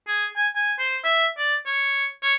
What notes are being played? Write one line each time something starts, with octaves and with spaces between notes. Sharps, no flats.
G#4
G#5
G#5
C5
E5
D5
C#5
C#5